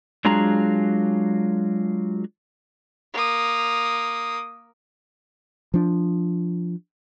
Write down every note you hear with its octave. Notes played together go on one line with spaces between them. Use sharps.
F#3 G#3 D4 F4 G#4 A#5
A#3 D#6
F3 D4